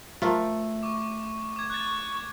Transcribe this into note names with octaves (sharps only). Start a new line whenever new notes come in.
F3 A3 F4 A#4
C#6 D6
D6 G#6
C#6 F#6 A6